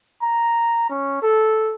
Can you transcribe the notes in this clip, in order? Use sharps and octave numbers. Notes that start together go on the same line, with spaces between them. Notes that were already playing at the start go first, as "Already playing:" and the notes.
A#5
C#4
A4